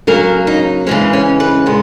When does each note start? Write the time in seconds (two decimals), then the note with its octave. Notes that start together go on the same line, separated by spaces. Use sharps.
0.07 C#3 F#3 A#3 A#4
0.47 D#4
0.86 C#3 E3 G#3 C#4
1.13 C#4
1.40 B4
1.66 A#2 G#3 B3